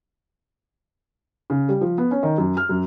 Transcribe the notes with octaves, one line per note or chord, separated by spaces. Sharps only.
C#3
G3
F3
B3
C#4
D#3
F#2
F6
F#2